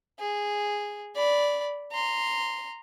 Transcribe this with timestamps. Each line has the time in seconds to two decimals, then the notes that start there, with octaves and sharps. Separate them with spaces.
0.20 G#4
1.15 D5 B5
1.92 A#5 C6